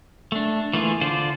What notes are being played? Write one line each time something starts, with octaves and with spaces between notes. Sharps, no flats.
A3 D4
E3 A3 A#3 F4 G#4
D3 F4 C5 D5